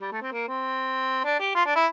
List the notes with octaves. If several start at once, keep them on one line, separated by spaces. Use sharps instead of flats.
G3
A3
C4
A#3
C4
D4
G4
F4
D4
E4